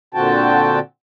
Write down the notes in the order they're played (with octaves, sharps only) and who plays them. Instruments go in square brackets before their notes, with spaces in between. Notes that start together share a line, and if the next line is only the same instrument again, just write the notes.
[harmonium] A#2 D3 C4 F#4 G5 A5